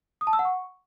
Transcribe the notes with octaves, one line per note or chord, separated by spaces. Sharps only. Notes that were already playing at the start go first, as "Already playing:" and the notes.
D#6
A5
E6
F#5
C#6